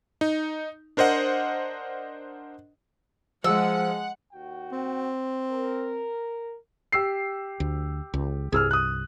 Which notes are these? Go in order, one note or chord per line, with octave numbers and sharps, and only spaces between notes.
D#4
D4 A#4 C5 D#5 F#5
F3 G#3 F#5 E6
D#2 F#4 G5
C4
A#4
G4 E6 C7
D2
C#2
C2 G2 G#4 E6 F6
D#6 F#6